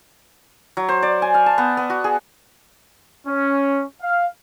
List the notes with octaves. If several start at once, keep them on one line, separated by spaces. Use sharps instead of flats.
F#3
C5
D5
G#5
F5
A5
B3
B3
F#4
G#4
C#4
F5